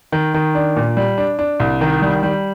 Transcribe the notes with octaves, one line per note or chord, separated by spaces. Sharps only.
D#3
D#3
D4
A#2
G3
D4
D4
C2
D#3
G3
G3